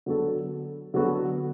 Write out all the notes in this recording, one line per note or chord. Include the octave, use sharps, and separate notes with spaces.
D3 F#3 B3 F#4 A4
D3 F#3 B3 F#4 A4